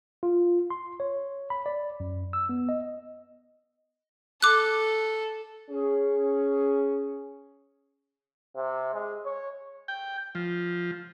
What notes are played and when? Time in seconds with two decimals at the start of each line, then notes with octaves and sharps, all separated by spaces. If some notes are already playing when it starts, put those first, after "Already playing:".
0.23 F4
0.70 C6
1.00 C#5
1.50 B5
1.66 D5
2.00 F#2
2.33 E6
2.49 B3
2.69 D#5
4.42 A4 D6 F#6
5.71 C#4 G#4
8.55 C3
8.94 G#3
9.25 C#5
9.88 G5
10.35 F3